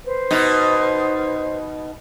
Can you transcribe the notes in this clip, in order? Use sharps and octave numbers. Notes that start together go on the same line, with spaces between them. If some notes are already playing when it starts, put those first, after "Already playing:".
B4 C5
B2 D#4